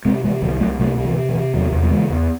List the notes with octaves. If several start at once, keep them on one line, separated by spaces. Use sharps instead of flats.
C3 G#3 C4
C3 E3 G#3
C2 D#3 F#3
C2 F#3 A3
C3 F#3 A3
C3
E3
C3
E3
C3
E2 D#3 F#3
E2
F#3
C#3 E3 G#3
E2